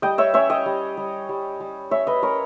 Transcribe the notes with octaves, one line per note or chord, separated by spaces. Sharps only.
G3 D#5 G5
C#5 E5
C#4 C#5 E5
D#5 G5
G3
G3
G3
G3
C#4 C#5 E5
B4 D#5
C#4 A#4 C#5